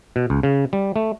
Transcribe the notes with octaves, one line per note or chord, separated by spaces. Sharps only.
B2
C#2
C#3
G3
A3